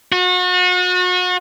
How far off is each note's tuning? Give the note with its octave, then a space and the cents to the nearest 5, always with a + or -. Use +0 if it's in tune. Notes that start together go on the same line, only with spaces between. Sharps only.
F#4 -35